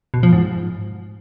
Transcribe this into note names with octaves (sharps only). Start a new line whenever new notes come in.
B2
F3
G#2